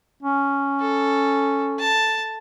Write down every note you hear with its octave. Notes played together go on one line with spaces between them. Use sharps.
C#4
A4
A5